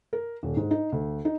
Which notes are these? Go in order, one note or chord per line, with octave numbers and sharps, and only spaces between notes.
A#4
D#1
G#2
D#4
D2
D#4